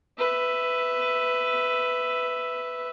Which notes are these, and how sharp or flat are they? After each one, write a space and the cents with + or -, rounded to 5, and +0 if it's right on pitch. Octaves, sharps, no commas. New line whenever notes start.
B4 +15 E5 +0